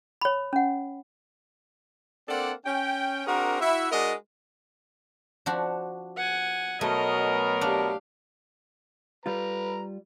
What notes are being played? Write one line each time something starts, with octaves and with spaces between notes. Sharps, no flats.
C#5 B5
C#4 F#5
A#3 C4 D4 A4 D5 F#5
C#4 G5
C4 D4 F#4 G#4 A#4
E4 F#4 E5
G#3 D4 F#4 A#4 D5 D#5
F3 D4 F#4
F#5 G#5
B2 F#3 A3 A#4 D#5
D4 G4 F5
G3 F4 B4 A#5